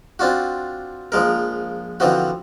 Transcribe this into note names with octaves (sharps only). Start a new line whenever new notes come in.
C4 D4 F4 F#4
A#1 F3 G#3 A#4
D3 E3 F3 C4 F#4